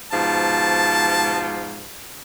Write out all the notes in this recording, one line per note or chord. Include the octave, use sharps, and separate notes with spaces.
G#2 B2 F3 A5